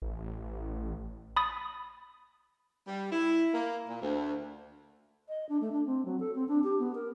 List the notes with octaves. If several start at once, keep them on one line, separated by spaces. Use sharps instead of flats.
A1
B5 D#6 A6
G3
E4
A#3
A#2
D2
D#5
D4
A3
D4
C4
F#3
A4
C4
D4
G4
B3
A#4